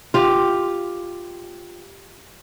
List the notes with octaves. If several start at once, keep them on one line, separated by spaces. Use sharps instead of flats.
F4 G4